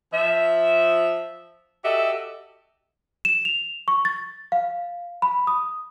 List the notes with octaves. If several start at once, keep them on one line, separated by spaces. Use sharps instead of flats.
F3 E5
F#4 G4 A4 D#5 E5
E7
F7
C#6
A6
F5
B5
D#6